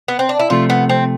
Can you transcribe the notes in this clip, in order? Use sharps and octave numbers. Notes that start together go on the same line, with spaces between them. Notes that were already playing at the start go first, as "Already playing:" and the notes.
B3
C4
D4
E4
C3 F3 A3 F4
B3
C4